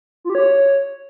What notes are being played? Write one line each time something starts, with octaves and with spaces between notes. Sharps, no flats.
F4
G4
C#5